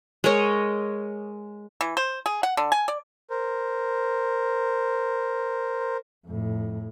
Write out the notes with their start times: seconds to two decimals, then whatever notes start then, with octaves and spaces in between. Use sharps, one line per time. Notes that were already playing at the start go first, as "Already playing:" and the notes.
0.24 G#3 A#4 C#5 D#5
1.81 E3
1.97 C5
2.26 G#4
2.43 F#5
2.57 D3
2.72 G#5
2.88 D5
3.30 A#4 C5
6.27 F2 A2